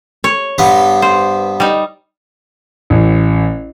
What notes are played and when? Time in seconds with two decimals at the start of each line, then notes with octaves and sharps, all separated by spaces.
0.24 C#5
0.58 G2 B3 C6
1.02 C5
1.60 G3 D#4
2.90 A1